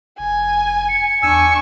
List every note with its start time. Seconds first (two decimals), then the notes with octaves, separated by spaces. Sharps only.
0.19 F1 G#5
0.89 C#7
1.23 E2 D4 G#5 C#6 E6